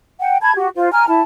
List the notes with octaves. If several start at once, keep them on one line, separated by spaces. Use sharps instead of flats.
F#5 G5
A5 B5 G#6
F#4 G4
F4 C5
G#5 A#5 F6
E4 A5